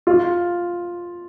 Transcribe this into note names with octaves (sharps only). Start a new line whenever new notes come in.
F4